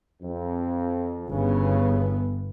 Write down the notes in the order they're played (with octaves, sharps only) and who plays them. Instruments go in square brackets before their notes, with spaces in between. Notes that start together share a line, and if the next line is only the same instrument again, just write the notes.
[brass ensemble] F2
[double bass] G1 B3 [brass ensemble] G2 C#3